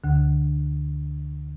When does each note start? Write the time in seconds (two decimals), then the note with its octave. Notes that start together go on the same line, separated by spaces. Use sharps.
0.04 D2 D3